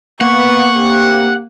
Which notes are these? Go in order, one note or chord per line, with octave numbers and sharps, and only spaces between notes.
A#3 B3 F#5 C#6
D2 C4 G4